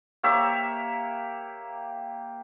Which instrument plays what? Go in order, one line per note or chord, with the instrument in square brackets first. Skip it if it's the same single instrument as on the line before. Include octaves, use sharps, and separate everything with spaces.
[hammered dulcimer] A#3 G4 C#5 E5